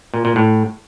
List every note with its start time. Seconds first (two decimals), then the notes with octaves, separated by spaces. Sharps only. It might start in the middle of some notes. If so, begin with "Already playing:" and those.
0.14 A#2
0.25 A#2
0.36 A2